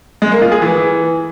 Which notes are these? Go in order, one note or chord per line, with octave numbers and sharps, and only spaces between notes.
G#3
A#3
F4
G#4
E3